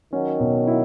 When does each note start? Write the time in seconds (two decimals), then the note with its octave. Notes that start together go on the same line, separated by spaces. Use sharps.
0.13 D#3 F#3 C#4
0.40 B2
0.67 E4